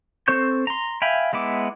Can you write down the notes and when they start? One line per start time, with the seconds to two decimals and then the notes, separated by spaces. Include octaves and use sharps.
0.28 C4 A4 C5 C#6 G6
0.67 A#5 C6
1.02 E5 F5 G5 G#5 B5
1.33 G#3 B3 E4 D6